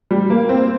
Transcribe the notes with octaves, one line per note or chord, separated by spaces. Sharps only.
G3
A#3
C4